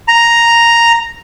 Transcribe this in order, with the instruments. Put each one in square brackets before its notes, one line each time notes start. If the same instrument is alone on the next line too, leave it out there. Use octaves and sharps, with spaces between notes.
[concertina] A#5